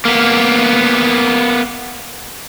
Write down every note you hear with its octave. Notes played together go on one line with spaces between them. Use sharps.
A#3 B3